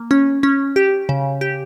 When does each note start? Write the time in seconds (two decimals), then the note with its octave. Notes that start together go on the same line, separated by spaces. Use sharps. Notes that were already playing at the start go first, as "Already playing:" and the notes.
Already playing: A#3
0.11 C#4
0.43 C#4
0.76 G4
1.09 C#3
1.41 G4